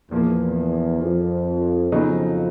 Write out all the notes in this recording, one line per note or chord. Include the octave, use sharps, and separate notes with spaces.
E2 A#2 F3 A#3
F2
F2 C#3 F#3 B3 D#4